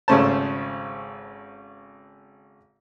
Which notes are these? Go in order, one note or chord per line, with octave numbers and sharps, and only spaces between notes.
G#1 C#3 A3 C#4 C5 A5